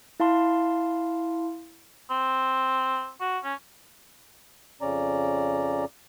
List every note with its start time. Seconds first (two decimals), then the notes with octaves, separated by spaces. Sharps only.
0.20 E4 F5 A5 C6
2.11 C4
3.21 F#4
3.44 C#4
4.81 F2 C#3 C#4 D5 A#5